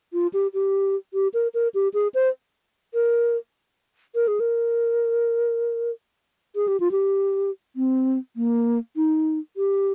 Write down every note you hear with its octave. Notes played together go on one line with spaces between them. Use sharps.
F4
G4
G4
G4
A#4
A#4
G4
G#4
C5
A#4
A#4
G#4
A#4
G#4
G4
F4
G4
C4
A#3
D#4
G4